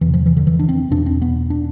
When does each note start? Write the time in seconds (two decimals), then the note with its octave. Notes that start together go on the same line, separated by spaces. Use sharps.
0.01 E2 C3 E3
0.14 F3
0.26 E3
0.37 D3
0.47 E3
0.59 D4
0.69 C4
0.91 E2 B2 D4
1.06 C4
1.22 B3
1.50 D4